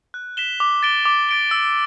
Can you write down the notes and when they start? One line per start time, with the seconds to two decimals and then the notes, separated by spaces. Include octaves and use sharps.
0.14 F#6
0.37 B6 E7 G7
0.60 D6
0.83 A6 D7 G7
1.05 D6
1.29 A6 D7 G7
1.51 E6